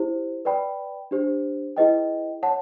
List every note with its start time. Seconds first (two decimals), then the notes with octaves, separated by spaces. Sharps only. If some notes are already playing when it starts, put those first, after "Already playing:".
Already playing: E4 G4 C5
0.45 B4 D5 G5 B5
1.11 D4 G4 C5
1.77 E4 G#4 B4 D#5 G5
2.43 C#5 F#5 A5